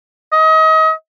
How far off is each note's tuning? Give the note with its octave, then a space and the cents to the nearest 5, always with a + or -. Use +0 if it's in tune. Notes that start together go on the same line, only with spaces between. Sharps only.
D#5 +30